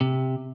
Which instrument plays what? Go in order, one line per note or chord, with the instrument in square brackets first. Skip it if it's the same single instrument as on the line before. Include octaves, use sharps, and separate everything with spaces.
[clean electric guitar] C3